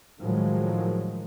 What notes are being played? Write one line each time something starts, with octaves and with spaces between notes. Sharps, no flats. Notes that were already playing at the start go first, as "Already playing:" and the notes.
A2 D#3 F3 F#3 G#3